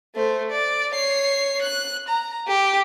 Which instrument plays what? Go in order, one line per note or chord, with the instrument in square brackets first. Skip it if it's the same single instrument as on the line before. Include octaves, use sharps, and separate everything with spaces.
[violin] A3 C5
D5
C#5 C7
F#6
A#5
G4